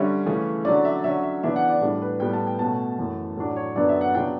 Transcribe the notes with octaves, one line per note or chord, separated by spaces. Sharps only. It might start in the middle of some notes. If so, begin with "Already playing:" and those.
Already playing: D3 G3 C#4 E5
C#3 E3 A3 C#4
D3 F#3 C#4 D5
E5
D3 F#3 C#4 E5
E5
C#3 E3 B3 D4 E5
F#5
D5
A2 G3 D4
B4
A2 G3 B3 G5
A5
G5
B2 A3 C#4 A5
F#2 E3 A3
A2 F#3 A3 D4
C#5
F#2 D3 F#3 B3 D4 D5
E5
F#5
C#3 F#3 B3 D4 G5